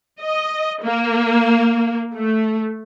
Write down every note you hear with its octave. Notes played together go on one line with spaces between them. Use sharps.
D#5
A#3
A3